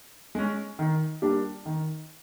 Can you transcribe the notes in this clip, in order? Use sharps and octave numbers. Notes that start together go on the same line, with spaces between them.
G#3 C#4
D#3
G3 A#3 D4 G4
D#3